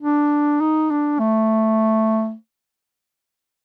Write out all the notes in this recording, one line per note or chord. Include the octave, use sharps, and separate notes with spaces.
D4
D#4
D4
A3